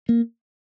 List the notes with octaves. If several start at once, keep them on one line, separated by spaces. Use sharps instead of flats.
A#3